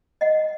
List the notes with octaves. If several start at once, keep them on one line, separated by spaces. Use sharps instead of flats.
D#5 F#5